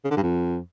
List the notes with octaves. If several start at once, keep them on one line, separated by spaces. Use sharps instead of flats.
C#3
D3
G2
F2